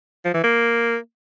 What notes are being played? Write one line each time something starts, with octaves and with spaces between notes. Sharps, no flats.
F3
E3
A#3